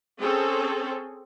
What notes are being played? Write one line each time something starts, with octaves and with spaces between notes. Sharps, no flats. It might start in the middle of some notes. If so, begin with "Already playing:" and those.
C4 C#4 G#4 A4